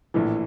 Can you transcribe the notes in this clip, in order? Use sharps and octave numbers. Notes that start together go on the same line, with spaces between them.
A#1 A2 E3